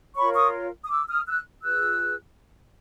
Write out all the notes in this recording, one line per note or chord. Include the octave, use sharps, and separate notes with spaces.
F4 A#4 C#5 B5 C#6
C#6 D#6
D#6
D6 E6
D#6 F6
E6 F#6
F4 G#4 B4 E6 F#6